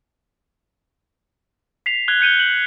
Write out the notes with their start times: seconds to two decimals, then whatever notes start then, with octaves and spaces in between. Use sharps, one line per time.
1.86 B6 C7 F7
2.08 F#6 G#6 F7 G7
2.21 G6 C#7 D#7 G7
2.40 F#7